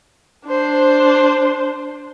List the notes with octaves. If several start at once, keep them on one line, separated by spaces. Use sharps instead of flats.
D4 C5